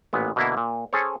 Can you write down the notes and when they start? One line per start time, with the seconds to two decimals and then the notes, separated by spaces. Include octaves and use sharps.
0.13 A1 A#2 B3
0.36 B2 D3 A#3 E4
0.57 A#2
0.93 C#4 G#4 A4 C5 C#5